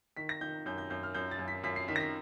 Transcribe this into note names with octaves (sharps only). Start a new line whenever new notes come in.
D#3 B6
A#6
D#3 G6
F#2 G6
G6
F#2 G6
F6
F#2 G6
A6
F#2
B6
F#2 B6
C7
D#3 B6
A#6
B6